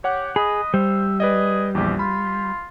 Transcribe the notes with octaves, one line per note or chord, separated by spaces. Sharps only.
G4 C#5 F#5 F#6
G#4 D#5 B5
G3 C5 E5
G#4 B4 D5 D#5
A#1 E2 G4
F4 B5